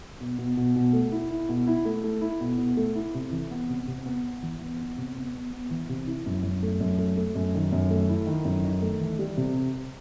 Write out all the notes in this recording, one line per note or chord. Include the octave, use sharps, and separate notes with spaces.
B2
B2
B2
B2
A3
E4
E4
B2
E4
A3
A3
E4
B2
B2
A3
E4
C3
E3
B3
C3
C3
B3
B3
E3
B3
B3
C3
B3
B3
B3
E3
C3
E4
F#2
F#2
A3
F#2
A3
A3
F#2
D#3
F#2
A3
E4
D#3
F#2
D#3
A3
E3
G3
C3